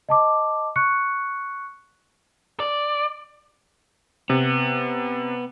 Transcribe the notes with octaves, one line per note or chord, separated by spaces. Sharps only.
D#5 A5 D6
C#6 F#6 C#7
D5
C3 B3